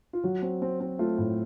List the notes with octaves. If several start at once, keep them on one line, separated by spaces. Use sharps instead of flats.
F4
F#3 F#4
C4
C4
C4
A3 F4
A2